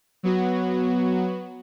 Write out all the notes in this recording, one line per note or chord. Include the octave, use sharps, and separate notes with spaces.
F#3 B3 F#4